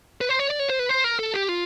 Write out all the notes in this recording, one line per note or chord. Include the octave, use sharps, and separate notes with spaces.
B4
C5
C#5
D5
C#5
C5
B4
C5
A#4
A4
G4
F4